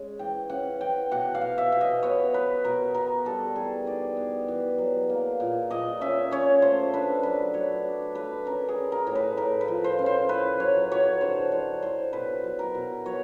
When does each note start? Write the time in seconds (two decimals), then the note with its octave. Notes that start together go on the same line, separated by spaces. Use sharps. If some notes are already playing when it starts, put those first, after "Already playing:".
Already playing: G#3 C#4
0.19 E3 G5
0.50 C#4 F#5
0.80 E3 G5
1.11 B2 F#5
1.35 F5
1.41 B2
1.58 E5
1.72 B2
1.81 D#5
2.03 B3 C#5
2.34 B3 B4
2.65 B2 A#4
2.94 B3 A#4
3.25 G3 A4
3.56 E3 G#4
3.86 D#4 D5
4.17 B3
4.48 E3
4.78 F#3
5.10 A#3
5.40 A#2
5.70 A#2 D#5
6.01 C#4 E5
6.31 C#4 C#5
6.62 A3 C5
6.94 D4 B4
7.23 F#3 B4
7.54 F#3 C#5
7.84 D4
8.15 A3 B4
8.46 C#4 A#4
8.69 G#4
8.76 C#4
8.92 A#4
9.07 A2
9.15 B4
9.37 A2 A#4
9.61 B4
9.68 F3
9.84 C5
9.99 C#4
10.06 C5
10.29 E4 B4
10.60 F#3 C#5
10.92 F#3 C#5
11.21 D3 C5
11.52 F#3 C#5
11.82 E4 C5
12.13 B2 B4
12.44 F#3
12.59 A#4
12.75 B2
13.06 F#3 C#5